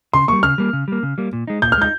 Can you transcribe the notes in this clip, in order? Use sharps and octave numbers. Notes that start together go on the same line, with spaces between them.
C#3 C6
G3 A#3 C#6
C#3 F6
G3 A#3
C#3
G3 A#3
C#3
G3 A#3
A#2
G#3 D#4
A#2 G6
F6
G#3 D#4 G6